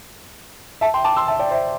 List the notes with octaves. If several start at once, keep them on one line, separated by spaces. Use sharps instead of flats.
E5 A5
G5 C6
A5 D6
C6 E6
E5 A5
D5 G5
C5 E5